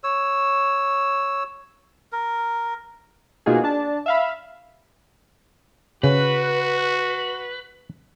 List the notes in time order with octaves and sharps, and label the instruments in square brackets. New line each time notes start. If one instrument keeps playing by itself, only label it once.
[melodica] C#5 E6
A#4
[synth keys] B2 A#3 D#4 F4 F#4 G#4
D4 A5
E5 F5 B5
[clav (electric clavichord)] C#3 [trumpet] F#4 [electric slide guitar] B4